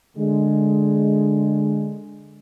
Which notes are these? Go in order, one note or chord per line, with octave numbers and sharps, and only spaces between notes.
D3 G#3